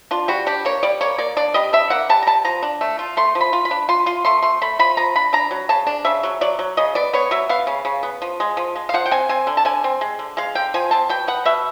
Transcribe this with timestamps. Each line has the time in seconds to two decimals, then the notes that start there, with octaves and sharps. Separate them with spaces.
0.11 D4 F4
0.28 G3 F#4
0.46 D4 G4
0.65 A#3 C#5
0.83 G3 D5
1.01 A#3 C#5
1.18 A#3 D5
1.37 D4 D5
1.54 G3 D#5
1.73 D4 E5
1.90 A#3 F#5
2.09 G3 A5
2.22 A#5
2.27 G3 A5
2.45 F3 A#5
2.63 D4
2.81 A3
2.99 F4
3.17 A3 C6
3.35 F3
3.41 B5
3.53 F4
3.65 B5
3.71 D4
3.89 F4 C6
4.06 F4 C6
4.25 A3 C6
4.43 A3 C6
4.62 A3 B5
4.79 F3 B5
4.97 F3 A#5
5.16 D4 B5
5.33 D4 A#5
5.51 F#3
5.69 C#3 A5
5.87 D4
6.05 C#3 E5
6.23 F#3
6.41 F#3 D5
6.59 F#3
6.77 C#3 D#5
6.95 B3 D5
7.13 B3 C#5
7.31 F#3 E5
7.49 B3 F5
7.67 C#3
7.85 C#3
8.03 B3
8.22 F3
8.40 G#3
8.57 F3
8.76 G#3
8.89 F5
8.94 F3 F#5
9.06 G5
9.11 C4 G#5
9.29 C4 G#5
9.47 D3
9.57 A5
9.65 D3 G#5
9.84 C4
10.01 G#3
10.19 D3
10.37 G#3 F5
10.55 D3 G5
10.74 F3 G#5
10.91 C4 A5
11.09 B2 G5
11.28 B3 F#5
11.45 B2 E5